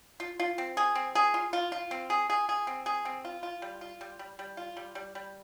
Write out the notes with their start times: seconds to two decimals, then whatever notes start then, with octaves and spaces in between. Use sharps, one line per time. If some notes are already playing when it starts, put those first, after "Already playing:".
0.20 F4
0.40 F4
0.58 C4
0.77 G#4
0.95 C4
1.15 G#4
1.34 F4
1.53 F4
1.72 F4
1.91 C4
2.10 G#4
2.30 G#4
2.49 G#4
2.67 C4
2.86 G#4
3.05 C4
3.25 F4
3.43 F4
3.62 G3
3.81 F4
4.01 G3
4.19 G3
4.39 G3
4.57 F4
4.77 G3
4.95 G3
5.15 G3